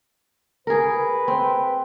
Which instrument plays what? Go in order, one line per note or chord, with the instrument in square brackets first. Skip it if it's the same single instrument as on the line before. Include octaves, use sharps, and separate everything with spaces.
[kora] G#4 A#4 [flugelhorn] B4
[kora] C4